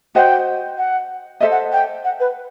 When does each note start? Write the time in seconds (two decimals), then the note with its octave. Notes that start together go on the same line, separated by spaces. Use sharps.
0.15 F#4 C5 D#5 F#5 G5
0.78 F#5
1.40 A4 C5 D#5 E5
1.51 F#5
1.72 G5
2.04 F#5
2.20 B4